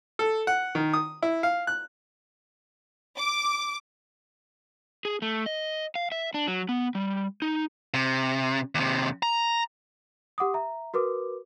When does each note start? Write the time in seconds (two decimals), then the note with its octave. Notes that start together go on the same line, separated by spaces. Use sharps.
0.19 A4
0.47 F#5
0.75 D#3
0.93 D#6
1.23 E4
1.43 F5
1.67 F#6
3.18 D6
5.05 G#4
5.22 A3
5.46 D#5
5.95 F5
6.12 E5
6.34 D4
6.48 F#3
6.69 B3
6.95 G3
7.42 D#4
7.94 C3
8.75 D#2 C3
9.23 A#5
10.38 G4 F#5 D6 D#6
10.54 E5 A#5
10.94 F#4 A#4 B4 D6